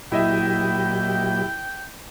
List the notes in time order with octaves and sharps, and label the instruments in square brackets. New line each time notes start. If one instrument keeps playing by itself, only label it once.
[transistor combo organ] A#2 F#3 G4 [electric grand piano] E4 D#5 E5 [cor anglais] G5